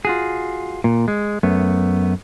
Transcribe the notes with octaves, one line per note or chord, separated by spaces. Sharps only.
F4 F#4 G#4
A#2
G#3
F#2 A3 B3